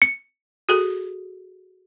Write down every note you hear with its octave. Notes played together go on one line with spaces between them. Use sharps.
C#7
F#4 G#4 A4